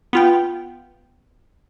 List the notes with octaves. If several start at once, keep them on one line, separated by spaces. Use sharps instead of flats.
B3 F4 G5